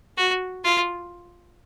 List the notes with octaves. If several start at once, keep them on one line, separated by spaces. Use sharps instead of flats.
F#4
F4